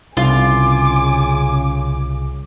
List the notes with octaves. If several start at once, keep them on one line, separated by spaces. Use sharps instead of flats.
C2 C#3 F4 G#5 D6